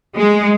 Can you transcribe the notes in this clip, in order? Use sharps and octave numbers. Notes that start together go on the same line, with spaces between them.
G#3